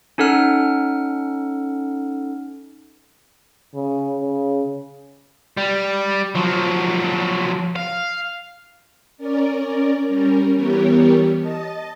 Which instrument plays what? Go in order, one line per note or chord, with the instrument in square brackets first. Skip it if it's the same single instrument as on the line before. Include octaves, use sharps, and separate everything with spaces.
[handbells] C#4 D#4 A4 F#5 F6
[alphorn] C#3
C#3
[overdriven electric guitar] G3
F3 F#3
F5
[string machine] C#4 A#4 D5
G3 C#4 A#4
E3 G3 B3 G4 A#4 C#5
D#5 A5